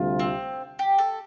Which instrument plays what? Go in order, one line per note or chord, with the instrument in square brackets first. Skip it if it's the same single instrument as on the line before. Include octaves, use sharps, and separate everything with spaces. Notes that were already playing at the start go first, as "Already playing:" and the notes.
Already playing: [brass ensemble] D2 C3 G3 F4
[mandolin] C4
G4
A4